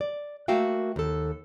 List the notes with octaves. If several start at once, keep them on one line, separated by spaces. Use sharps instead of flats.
D5
A3 A#3 F#4 E5 F5 G5
D#2 A4